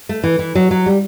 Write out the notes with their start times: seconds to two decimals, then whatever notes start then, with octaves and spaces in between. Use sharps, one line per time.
0.09 A3
0.24 E3
0.39 E3
0.55 F#3
0.71 F#3
0.86 G3